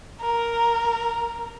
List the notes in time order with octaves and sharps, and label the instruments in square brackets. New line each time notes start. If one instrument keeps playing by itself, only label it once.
[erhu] A#4